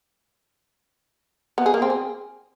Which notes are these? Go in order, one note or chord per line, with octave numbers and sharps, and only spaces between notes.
B3
G#4
A#3
C4
G#4